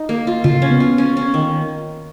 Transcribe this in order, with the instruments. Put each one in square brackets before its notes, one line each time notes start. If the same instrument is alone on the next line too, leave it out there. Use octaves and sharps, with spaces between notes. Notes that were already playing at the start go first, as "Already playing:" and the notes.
Already playing: [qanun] D#4
A#3
F4
[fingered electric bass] C#3 [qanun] F4
[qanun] C#4
[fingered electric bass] B3
[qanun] F4
C#4
C#4
D#3